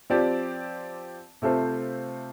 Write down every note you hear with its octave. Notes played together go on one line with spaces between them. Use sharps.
F3 C4 G4 D5
C3 A3 F4 A4 C5